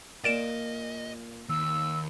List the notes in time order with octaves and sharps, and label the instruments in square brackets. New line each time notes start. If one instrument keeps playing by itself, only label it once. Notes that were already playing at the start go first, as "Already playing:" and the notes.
[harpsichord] A#2 [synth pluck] D5 D7 E7 [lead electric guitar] D#5
[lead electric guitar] D#2 [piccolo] E6